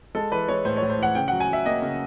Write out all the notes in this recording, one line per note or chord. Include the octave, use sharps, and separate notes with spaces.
G#3 A4
E3 B4
G#3 C#5
A2 C5
C#5
A2
C5
E3 F#5
C#3 G5
F#3 F#5
G#5
F#3 E5
A#3 D#5
C#3